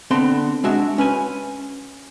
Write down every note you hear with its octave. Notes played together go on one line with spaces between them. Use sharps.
D3 B3 C4 A4 C6
G#3 D4 F#4 E5
C#4 B4 G#5